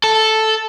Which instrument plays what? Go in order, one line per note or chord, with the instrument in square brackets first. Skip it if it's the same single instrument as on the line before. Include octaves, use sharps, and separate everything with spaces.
[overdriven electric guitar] A4